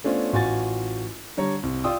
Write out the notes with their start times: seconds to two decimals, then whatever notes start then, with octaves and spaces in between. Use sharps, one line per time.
0.04 A3 B3 C#4 D4 F4 C5
0.33 A1 F4 F#4 G#5 A6
1.37 D3 G3 C#5 A#5
1.63 C2
1.84 F4 D5 G5 D#6 E6